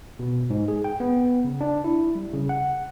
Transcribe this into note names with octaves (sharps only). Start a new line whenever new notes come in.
B2
G#2
G#4
G5
B3
C#3
D4
E4
G3
C#3
F#5